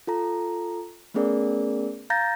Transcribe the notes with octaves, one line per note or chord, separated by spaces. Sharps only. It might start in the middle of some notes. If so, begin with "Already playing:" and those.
F4 A4 A#5
A3 B3 C#4 G#4 A#4 D5
F5 A#5 G6 A6 A#6